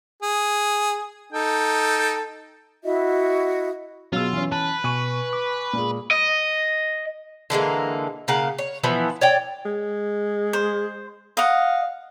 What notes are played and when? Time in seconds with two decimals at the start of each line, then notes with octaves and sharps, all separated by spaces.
0.23 G#4
1.33 D#4 A4 G5
2.84 E4 F#4 D#5 E5
4.13 B2 F#3 B3 F4 G#4 E6
4.33 E3 C#4
4.52 B4 A5
4.84 B2 G#5 C#6 D#7
5.33 D6
5.73 A#2 G#3
6.11 D#5
7.50 D3 E3 G#3 A#3
8.28 C#3 A#3 F5 F#5
8.58 C#5
8.83 E3 F3 B3 E4
9.21 C#5 D5 G5
9.65 G#3
10.53 C5
11.37 D#5 F5 F#5